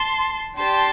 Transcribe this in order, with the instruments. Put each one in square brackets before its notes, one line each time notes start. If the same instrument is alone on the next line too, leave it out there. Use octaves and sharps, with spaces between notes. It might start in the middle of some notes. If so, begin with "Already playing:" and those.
Already playing: [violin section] A5 C6
D4 G4 A5 C6